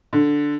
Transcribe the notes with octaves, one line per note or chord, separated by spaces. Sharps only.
D3